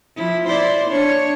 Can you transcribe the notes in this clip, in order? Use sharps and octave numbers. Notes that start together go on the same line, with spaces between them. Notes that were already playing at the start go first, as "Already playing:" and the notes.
F3 E4
E4 C5 D5
D4 C#5